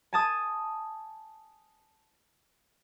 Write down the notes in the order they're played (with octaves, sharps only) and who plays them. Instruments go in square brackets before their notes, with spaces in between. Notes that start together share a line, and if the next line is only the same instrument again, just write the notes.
[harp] G#5 A5 D#6